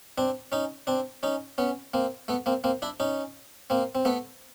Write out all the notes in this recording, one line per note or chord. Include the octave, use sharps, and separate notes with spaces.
C4 D4
C#4 D#4
C4 D4
C#4 D#4
B3 C#4
A#3 C4
A3 B3
A#3 C4
A#3 C4
D4 E4
C#4 D#4
A#3 C4
C4
A3 B3